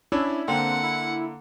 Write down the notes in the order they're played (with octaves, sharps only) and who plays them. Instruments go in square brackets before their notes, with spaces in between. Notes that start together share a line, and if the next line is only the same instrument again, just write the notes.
[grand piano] C#4 D4 [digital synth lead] E4
[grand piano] D3 A#3 [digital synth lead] C4 [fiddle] F#5
[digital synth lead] E4